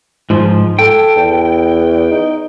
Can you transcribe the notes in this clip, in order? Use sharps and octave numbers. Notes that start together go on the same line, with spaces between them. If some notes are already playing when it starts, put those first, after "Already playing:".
G#2 F3
A4 G5
E2
D#4